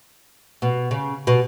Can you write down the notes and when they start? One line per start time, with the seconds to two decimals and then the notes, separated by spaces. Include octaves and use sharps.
0.62 B2
0.91 C#3
1.27 B2